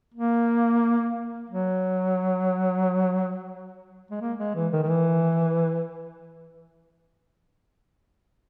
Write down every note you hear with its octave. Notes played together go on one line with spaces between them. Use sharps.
A#3
F#3
G#3
A#3
G#3
E3
D#3
D#3
E3